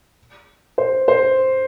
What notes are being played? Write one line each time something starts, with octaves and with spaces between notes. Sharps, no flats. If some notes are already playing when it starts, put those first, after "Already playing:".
C5
C5